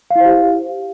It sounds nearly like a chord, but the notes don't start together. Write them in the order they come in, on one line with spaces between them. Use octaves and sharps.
F5 E4 C5 G4